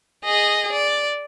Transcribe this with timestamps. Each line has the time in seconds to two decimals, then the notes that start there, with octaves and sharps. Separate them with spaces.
0.25 G#4 D#5
0.73 D5